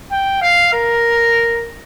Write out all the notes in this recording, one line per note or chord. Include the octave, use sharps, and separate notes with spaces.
G5
F5
A#4